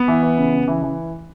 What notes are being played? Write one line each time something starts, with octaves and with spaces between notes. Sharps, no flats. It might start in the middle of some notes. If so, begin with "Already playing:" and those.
Already playing: B3 B4
E3
E3
C#3
C#3
E3
E3